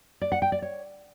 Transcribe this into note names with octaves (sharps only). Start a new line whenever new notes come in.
D5
F#5
G5
D5
C#5